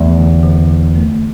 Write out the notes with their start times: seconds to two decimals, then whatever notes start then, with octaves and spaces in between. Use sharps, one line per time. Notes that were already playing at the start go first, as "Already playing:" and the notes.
Already playing: E2 A3
0.17 D3
0.43 D3
0.70 D3
0.96 A3